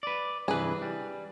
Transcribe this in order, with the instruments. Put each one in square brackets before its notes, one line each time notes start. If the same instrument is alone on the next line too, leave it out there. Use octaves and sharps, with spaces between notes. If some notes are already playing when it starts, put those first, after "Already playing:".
[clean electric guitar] B4 D5
[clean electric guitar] G2 C3 E3 [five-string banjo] G#4 B4
[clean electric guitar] G3